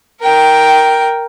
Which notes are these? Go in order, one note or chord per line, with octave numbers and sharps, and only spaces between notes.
A#4 G5